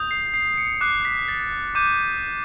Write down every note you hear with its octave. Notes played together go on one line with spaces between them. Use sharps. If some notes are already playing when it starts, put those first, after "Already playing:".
Already playing: D#6 G6
C7
C7
C#7
D6 F#6 C7
B6
A6
D6 G6 D#7